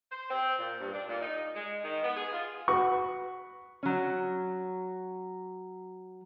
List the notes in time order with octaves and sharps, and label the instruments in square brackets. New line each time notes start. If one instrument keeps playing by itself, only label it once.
[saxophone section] C5
C4
A#2
G2
D4
A#2
D#4
G#3
D#3
B3
G#4
F4
[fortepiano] F#4 B4 F#5 C#6
[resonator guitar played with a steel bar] F#3 C#4